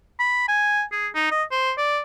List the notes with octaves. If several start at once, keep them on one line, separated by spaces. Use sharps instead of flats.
B5
G#5
G#4
D#4
D#5
C5
D5